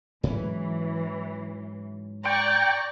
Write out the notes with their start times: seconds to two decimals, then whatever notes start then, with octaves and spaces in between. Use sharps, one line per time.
0.23 G#2 E3 F#3 C#4
2.25 D5 G5 A#5 C#6